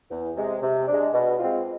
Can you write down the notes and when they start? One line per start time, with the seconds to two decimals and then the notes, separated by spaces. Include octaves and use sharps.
0.10 E2
0.36 C3 G#3
0.62 C3
0.87 G#3 D4
1.13 B2
1.39 G#3 C4 F4